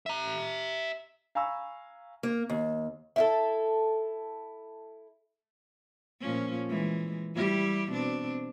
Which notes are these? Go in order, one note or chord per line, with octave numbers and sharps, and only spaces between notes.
E5 A#5
F5 G#5 A#5 B5 C#6 E6
A#3
D#2
E4 F4 A4
A#2 F3 C#4
E3 G#3
G3 E4 G4
B2 C4 D4